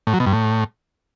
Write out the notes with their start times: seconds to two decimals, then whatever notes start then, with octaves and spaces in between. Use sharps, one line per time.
0.07 A2
0.13 F#3
0.20 B2
0.26 G2
0.33 A2